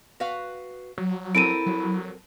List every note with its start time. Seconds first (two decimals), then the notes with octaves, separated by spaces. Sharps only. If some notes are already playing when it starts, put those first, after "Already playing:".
0.20 F#4 B4 F5
0.98 F#3
1.35 C4 E4 A4 A#4 D7 D#7
1.66 F#3